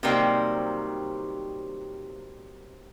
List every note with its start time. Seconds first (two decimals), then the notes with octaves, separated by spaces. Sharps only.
0.03 C3 D#3 F#3 G3 A#3 C4